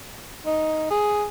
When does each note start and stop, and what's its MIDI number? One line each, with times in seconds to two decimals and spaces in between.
0.46 0.86 63
0.90 1.26 68